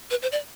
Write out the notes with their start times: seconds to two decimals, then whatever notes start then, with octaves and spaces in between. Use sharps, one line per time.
0.11 B4
0.22 C5
0.32 D5